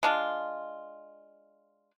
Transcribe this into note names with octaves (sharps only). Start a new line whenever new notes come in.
G#3 D4 F4